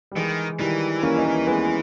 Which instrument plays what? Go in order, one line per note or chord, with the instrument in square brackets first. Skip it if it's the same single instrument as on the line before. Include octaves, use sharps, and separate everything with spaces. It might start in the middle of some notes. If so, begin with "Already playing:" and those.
[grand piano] G3
[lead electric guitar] D#3 [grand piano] E3 G#3
[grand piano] D#3 G3 [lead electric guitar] E3
[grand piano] A#3 C#4
D#4
A#3 C#4
G#3 B3